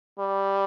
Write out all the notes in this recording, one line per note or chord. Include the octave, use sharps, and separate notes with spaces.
G3